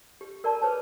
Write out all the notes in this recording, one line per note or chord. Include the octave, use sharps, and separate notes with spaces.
G4
A#4 D5 A5 A#5
G#4 B4 C#5 A5